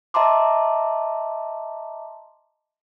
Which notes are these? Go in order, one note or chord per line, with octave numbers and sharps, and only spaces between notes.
D#5 E5 A5 A#5 C6 D6